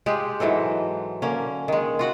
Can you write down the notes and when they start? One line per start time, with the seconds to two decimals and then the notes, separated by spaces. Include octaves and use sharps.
0.06 G#3 F4 G4
0.40 G#2 E3 F#3 A4
1.22 D3 A#3 C#4
1.68 D#3 G#3
1.99 F4 F#4 F#5